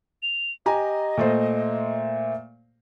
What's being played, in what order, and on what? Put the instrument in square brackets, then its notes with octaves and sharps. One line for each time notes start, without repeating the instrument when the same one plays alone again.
[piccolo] F7
[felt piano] G4 G#5 A#5 [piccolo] D#5
[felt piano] A#2 A3 C5